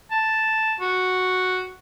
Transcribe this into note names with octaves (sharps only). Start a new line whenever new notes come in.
A5
F#4